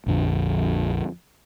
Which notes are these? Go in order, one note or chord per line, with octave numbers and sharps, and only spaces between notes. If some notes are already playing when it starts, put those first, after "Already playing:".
A#1 F2 D3